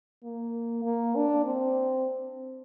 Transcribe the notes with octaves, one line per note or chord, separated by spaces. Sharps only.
A#3
A#3
D4
C4